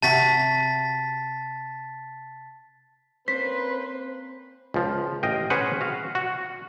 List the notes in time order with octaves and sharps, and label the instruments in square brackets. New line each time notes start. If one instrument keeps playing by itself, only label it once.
[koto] C3 F#4 [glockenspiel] A5 A6 B6
[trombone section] A#3 C#4 B4 [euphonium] C4 [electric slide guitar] C5 [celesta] B6
[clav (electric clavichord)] C#2 F3
A1 D#5 F5 G5
C#4 G#4 B4 C5 F#5
F#4 F5
F#4